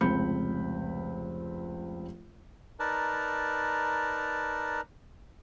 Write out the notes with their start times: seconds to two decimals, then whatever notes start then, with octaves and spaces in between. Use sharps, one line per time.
0.01 F1 C#2 C4 B5 G6 C#7
2.80 D#4 A#4 B4 D5 A5